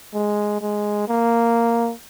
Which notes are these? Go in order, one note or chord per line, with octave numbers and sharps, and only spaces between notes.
G#3
G#3
A#3